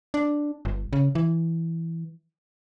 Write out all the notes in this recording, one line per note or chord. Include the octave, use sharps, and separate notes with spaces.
D4
G1
C#3
E3